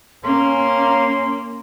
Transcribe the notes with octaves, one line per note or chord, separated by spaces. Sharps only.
A#3 C#4 C6